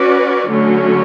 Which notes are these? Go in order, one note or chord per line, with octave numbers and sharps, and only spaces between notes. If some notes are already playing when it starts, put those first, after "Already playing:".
Already playing: C#4 F#4 B4 D5
D3 F#3 A3 C#4